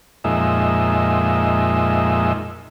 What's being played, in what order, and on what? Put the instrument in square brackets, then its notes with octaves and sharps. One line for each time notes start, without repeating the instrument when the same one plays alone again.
[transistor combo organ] F2 A#2 G#3 D#4 E5